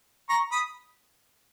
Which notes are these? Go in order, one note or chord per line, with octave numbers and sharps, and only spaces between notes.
A#5 C#6
B5 D#6